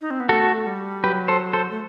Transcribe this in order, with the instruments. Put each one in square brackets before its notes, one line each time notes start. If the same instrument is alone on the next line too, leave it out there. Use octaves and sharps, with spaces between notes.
[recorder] D#4
C4
B3
[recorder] A3 [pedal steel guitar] F#4 A4
[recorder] G3
[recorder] F#3 [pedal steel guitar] G4 B4
[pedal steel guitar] A4 C5
A4 C5
[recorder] A3